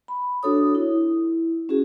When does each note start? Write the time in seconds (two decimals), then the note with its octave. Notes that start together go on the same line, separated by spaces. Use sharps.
0.08 B5
0.43 D4 F#4 A4 C#5 D#6
0.75 E4
1.69 C#4 F#4 G#4